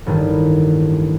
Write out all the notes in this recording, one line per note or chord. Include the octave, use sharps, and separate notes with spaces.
A1 G2 D#3